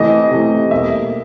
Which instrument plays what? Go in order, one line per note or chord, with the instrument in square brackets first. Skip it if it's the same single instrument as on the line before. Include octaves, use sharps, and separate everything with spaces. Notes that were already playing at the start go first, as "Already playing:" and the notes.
Already playing: [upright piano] C3 E3 A3 D#5
C3 E3 A3
B2 G3 A#3 E5